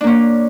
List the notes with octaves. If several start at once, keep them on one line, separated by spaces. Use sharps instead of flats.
A#3 C#4 D4